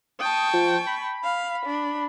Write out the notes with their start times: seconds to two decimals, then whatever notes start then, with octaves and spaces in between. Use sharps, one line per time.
0.19 G5 A5 C#6 D#6
0.53 F3
0.87 B5
1.23 F5
1.65 D4